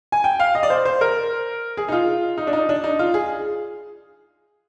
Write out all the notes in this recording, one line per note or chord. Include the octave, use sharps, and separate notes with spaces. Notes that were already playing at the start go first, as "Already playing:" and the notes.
G#5
G5
F5
D#5
D5
C5
C5
A#4
G#4
D#4
F4
D#4
D4
D#4
D4
D#4
F4
G#4